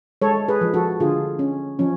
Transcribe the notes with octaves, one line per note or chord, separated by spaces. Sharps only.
G#3 A4 C#5
G#4 B4
F3
F#4 A4
D3 F4 G#4
C#4
F3 C#4